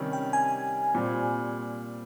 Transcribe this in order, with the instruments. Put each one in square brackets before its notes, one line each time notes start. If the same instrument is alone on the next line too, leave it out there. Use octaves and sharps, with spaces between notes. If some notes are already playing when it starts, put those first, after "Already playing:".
Already playing: [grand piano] C3 D#3 G3 C#4
[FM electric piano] G5
G#5
[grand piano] A#2 G3 C4